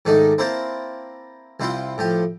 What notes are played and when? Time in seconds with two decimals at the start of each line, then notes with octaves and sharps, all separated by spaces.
0.05 G#2 D#3 A3 D4 D#4
0.38 A#3 C4 E4 A#4 C5 A5
1.60 C2 C4 E4 F4 C6
1.98 A2 F3 G4